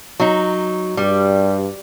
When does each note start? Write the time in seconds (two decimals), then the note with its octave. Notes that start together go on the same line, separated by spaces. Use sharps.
0.20 F#3 D#4
0.97 G2 G3